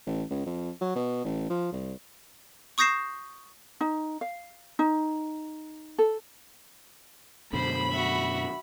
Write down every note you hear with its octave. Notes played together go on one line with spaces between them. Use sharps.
A1
C#2
F2
F#3
B2
A1
F3
C2
C#6 D#6 G6 A#6 C7 E7
D#4
F5
D#4
A4
F#2 B2 D3 C5 B5
F#4 E5